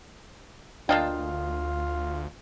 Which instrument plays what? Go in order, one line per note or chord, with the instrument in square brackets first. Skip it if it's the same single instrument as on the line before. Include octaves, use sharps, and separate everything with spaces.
[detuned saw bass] D2 [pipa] A#3 D#5 G5 [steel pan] D4 F5 A5 [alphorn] F4